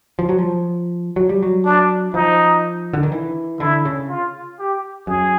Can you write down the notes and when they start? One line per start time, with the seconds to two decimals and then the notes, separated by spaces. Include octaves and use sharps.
0.19 F3
0.29 F#3
0.39 F3
1.16 F#3
1.29 G3
1.43 F#3
1.65 D4
2.14 F3 D#4
2.93 D3
3.03 D#3
3.12 E3
3.60 D3 E4
3.85 C#3
4.10 F4
4.59 G4
5.07 F#2 G#4